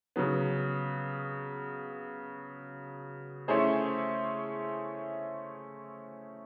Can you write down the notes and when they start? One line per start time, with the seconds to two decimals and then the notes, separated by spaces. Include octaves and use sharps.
0.16 C#3 F#3 B3
3.48 A3 C#4 E4 G#4 C5